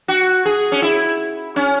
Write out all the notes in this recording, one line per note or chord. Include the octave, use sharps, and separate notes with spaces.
F#4
G#4
C#4
E4
C#4